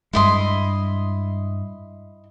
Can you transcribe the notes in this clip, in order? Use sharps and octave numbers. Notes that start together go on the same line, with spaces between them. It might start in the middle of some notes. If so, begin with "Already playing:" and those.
G2 G#3 E4 D#5 C6